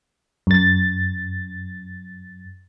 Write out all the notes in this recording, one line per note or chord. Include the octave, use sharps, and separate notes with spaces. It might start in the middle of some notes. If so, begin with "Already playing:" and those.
F#2 A6